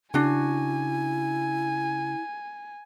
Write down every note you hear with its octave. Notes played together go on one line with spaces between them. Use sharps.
C#3 D4 E4 F#4 G#5